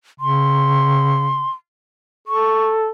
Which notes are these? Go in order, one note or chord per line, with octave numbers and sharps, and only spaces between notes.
C#3 C6
A4 C#6